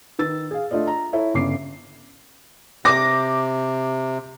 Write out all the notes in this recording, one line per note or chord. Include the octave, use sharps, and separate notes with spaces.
D#3 B4 E6 A6
G#4 F5
A3 D4 F4 D5 D#5
A#5
E4 A4 C#5 E5
G1 C#3 D6 C7
C3 D6 A#6